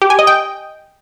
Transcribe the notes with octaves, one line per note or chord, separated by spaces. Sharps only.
G4
G#5
D#5
G5